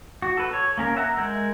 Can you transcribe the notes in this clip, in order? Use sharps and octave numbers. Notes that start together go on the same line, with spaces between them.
F#4
A4 B4
C#5
A#3 C#4 A#4
E5 F#5 A#5
G#3 A#4 G6